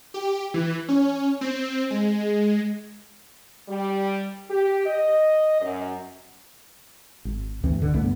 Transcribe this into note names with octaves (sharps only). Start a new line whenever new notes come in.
G4
E3
C#4
C4
G#3
G3
G4
D#5
F#2
G#1
D2 G2 E3 C4
D3
C2 G2 A3 B3